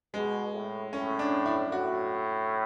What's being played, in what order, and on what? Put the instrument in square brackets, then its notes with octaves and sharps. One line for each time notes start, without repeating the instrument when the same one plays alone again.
[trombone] B2 [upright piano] G#3
[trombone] A2
[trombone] A2 [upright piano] C#4
[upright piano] D4
E4
[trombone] A2 [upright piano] F#4